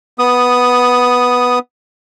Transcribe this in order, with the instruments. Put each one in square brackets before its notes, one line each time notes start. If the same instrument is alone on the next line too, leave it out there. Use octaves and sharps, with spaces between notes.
[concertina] B3 D#6